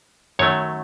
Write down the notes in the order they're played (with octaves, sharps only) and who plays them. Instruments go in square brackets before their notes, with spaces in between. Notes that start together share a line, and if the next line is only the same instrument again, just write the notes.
[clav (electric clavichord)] F#2 D#3 F#3 A3 C#5